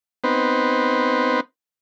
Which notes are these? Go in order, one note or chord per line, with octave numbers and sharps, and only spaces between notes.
B3 C4 D#4 B4 C5